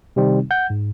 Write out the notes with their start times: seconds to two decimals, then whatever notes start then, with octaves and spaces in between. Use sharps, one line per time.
0.16 C3 D#3 G3 C4 D#4
0.51 F#5 G6
0.70 G#2